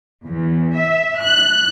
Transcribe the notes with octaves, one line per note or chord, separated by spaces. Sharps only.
E2
E5
F#6